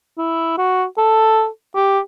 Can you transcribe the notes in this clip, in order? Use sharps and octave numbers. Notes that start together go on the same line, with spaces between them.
E4
F#4
A4
G4